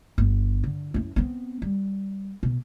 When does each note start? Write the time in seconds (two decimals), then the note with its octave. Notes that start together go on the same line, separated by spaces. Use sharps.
0.18 G1
0.64 D3
0.94 F#2 E4
1.16 B3 C4
1.62 G3
2.43 B2